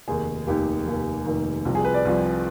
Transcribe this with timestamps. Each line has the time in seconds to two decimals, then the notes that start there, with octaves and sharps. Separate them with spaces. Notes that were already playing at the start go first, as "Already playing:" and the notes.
0.08 F1 D#2 D#3 G#4
0.47 F1 D#2 D#3 G4
0.86 F1 D#2 D#3
1.25 F1 D#2 D#3
1.65 C2 C3 F3
1.75 G#4
1.85 B4
1.94 D5
2.05 C2 C3 F3